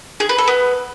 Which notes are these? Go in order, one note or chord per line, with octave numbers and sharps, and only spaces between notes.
G#4
B4
A4
B3